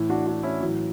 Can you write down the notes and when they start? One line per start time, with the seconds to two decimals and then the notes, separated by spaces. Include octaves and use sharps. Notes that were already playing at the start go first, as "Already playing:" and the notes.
Already playing: A2 E3
0.10 D4 F#4
0.26 D4 F#4
0.43 C#4 E4
0.60 A2 E3 F#3